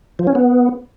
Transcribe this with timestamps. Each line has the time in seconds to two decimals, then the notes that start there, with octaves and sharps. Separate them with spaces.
0.19 F3
0.27 C#4
0.35 B3